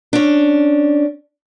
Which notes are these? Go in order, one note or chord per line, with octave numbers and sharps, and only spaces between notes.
C#4 D4